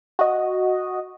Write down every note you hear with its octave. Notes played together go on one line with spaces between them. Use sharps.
F#4 D#5